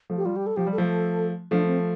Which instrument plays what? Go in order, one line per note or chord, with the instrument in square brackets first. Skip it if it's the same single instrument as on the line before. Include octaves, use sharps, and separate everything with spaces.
[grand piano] F3 A3
[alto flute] G4
[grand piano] G3 [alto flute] F4
[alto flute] G4
A4
[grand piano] F3 [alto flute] G4
[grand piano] G3
[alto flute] A4
[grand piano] F3 A3
[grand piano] F3 A3 [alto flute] D4
[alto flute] C4